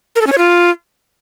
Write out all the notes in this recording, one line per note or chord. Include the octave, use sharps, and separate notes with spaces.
A#4
A4
C#4
C#5
F4